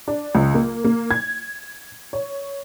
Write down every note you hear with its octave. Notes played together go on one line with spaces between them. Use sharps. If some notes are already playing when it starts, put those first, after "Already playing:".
D4
C#2
A#3
A#3
G#6
C#5